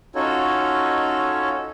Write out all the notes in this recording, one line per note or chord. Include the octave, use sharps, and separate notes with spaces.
C#4 D#4 F4 F#4 A4 C#5